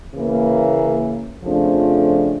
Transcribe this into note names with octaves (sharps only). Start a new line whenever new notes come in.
C#3 E3 A#3
F2 C#3 F3 A3 D4